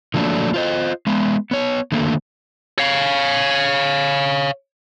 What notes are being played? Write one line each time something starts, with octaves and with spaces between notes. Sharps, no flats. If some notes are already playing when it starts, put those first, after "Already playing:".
D3 F3 F#3 A3 A#3 D4
F4 C5 D#5
G#3 B3
B3 C#5
D3 D#3 A3 A#3
C#5 F5